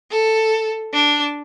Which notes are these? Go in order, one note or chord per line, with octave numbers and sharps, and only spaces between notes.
A4
D4